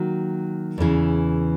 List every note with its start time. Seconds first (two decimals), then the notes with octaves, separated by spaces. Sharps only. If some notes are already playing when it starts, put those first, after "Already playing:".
Already playing: D#3 F#3 A#3
0.78 E2 C#3 E3